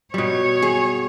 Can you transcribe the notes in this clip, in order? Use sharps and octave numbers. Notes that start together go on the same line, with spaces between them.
B2 G3 C#5
G#4